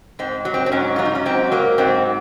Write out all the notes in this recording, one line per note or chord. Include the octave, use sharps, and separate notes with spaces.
G#2 C4
F#3
C4
C4
G#2 C#4
F#3 F4
D#4
C#4
G#2 C4
F#3 A#3
G#2 C4